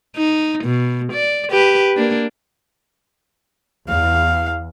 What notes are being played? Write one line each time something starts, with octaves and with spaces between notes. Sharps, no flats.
D#4
B2
D5
G4 B4
A#3 D4
E2 F5